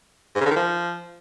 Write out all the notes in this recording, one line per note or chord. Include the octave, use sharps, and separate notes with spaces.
G#2
C#3
D3
D#3
F3